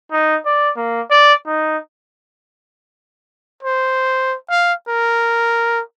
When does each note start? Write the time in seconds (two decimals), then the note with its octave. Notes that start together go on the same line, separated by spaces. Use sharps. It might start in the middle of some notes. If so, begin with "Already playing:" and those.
0.11 D#4
0.46 D5
0.76 A#3
1.10 D5
1.47 D#4
3.63 C5
4.50 F5
4.88 A#4